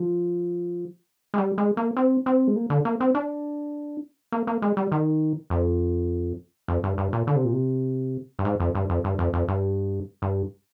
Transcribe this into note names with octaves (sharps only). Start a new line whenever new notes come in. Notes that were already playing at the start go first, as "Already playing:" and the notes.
Already playing: F3
G#3
G3
G#3
A#3
C4
C4
G#3
A#3
D3
A#3
C4
D4
A#3
A#3
G#3
G3
D#3
F2
F2
G2
G2
A#2
D3
C3
A#2
C3
G2
G#2
F2
G2
F2
G2
F2
F2
G2
G2